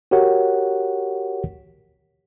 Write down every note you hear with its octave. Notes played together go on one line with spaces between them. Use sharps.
F#4 G4 A#4 C#5 F#5